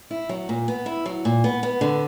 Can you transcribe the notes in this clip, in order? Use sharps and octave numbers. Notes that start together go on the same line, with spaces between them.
E4
F#3
A#2
B3
E4
F#3
A#2
B3
B3
D3